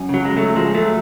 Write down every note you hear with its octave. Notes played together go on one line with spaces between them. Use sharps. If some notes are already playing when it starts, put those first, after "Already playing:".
Already playing: F#2 C#4
C#3 F#3
G#3
G#2 F#3 A3
F3 G#3
G#2
F#3 A3